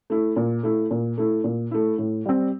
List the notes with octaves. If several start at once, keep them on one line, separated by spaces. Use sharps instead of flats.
A3 E4
A#2
A3 E4
A#2
A3 E4
A#2
A3 E4
A2
G3 C4